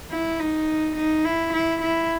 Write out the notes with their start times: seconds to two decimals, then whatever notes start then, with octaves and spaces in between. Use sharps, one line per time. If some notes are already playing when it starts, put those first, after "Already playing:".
0.11 E4
0.39 D#4
0.96 D#4
1.25 E4
1.53 E4
1.82 E4